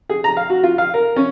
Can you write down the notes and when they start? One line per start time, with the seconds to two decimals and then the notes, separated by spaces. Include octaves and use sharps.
0.09 G#4
0.24 A#5
0.37 F5
0.50 F#4
0.63 F4
0.78 F5
0.94 A#4
1.16 C#4